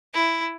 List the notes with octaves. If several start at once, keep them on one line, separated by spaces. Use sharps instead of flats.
E4